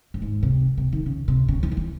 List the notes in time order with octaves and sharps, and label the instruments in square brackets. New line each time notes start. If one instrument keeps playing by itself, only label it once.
[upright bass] F#2
G#2
C3
C3
D#3
C#3
C3
C#3
E3
D#3
E3